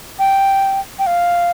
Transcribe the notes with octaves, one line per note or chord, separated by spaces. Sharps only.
G5
G5
F5